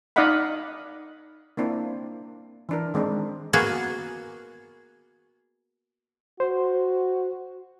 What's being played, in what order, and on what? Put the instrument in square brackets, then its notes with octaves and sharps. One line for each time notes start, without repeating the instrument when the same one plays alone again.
[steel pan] D#4 D5 D#5 F5 F#5 B5
A#3 C4 D4 E4
E3 D4 A#4
D#3 G#3 C4 D4 D#4
[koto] A#3 B3 F#4 G#4
[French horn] F#4 [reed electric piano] C5